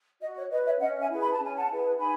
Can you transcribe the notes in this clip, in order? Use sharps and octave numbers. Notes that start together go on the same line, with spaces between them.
F#4 D#5
C#5
B4 D#5
C#5 E5
C#4 D#5 F#5
E5 G#5
E4 G#4 B4
B5
A5
C#4 G#5
F#5 A5
E4 G#4 B4
D#4 G#5 B5